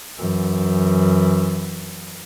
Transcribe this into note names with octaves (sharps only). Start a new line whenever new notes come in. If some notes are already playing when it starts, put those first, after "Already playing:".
F#2 E3